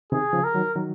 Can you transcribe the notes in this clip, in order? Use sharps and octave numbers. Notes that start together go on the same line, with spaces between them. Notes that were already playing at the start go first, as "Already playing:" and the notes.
C3 D#3 G#4
C#3 F3
A#4
D#3 F#3
D#3 F#3